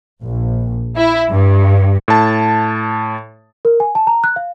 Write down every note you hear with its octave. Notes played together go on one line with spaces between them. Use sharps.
A#1
E4
G2
A2 A5
A#4
G#5
A5
A#5
F#6
F5